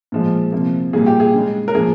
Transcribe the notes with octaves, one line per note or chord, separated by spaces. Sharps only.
A#2 F3 G#3
C3 F3 A#3
A#2 G3 A#3 G#4
G4
G#4
C#3 G#3
A#4
A#2 F3 A#3 G#4